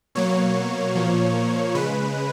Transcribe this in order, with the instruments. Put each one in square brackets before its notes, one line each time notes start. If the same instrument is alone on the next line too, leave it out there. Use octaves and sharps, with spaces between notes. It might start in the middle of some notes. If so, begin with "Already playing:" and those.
[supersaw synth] B2 F#3 A#3 C#5
A#2 F3 A#3
C#3 G#3 B4